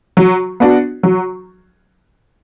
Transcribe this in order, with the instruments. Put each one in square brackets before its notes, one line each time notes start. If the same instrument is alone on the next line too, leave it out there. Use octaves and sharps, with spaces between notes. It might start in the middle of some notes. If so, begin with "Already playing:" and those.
[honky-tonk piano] F#3
B3 D4 F#4
F#3